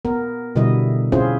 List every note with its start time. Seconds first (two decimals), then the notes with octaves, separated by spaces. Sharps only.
0.05 B3 A#4
0.56 B2 D3 G3 B3 E4 D#5
1.12 C4 C#4 E4 F4 G#4 C5